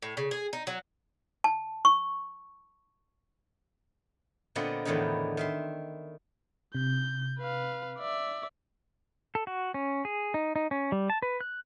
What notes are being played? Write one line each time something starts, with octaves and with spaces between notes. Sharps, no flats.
A2
C#3
G#4
D#4
F#3
A5
C#6
A#2 D3 B3 C4 F4 D#5
E2 A2 D3 D#3 B3 D#4
D#3 E5 C6
C3 G6
B4 F5
D5 E5
A4
F#4
C#4
G#4
D#4
D#4
C#4
G3
A5
B4
F#6